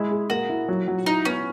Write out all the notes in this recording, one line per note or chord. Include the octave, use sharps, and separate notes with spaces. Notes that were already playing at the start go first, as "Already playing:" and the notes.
Already playing: G#3 E4
G#4
A#3 F#4
E4
F#3
F#3
D#4 E4
B3 C#4